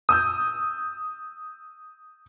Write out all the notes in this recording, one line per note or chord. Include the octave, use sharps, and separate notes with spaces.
D#6 E6 G6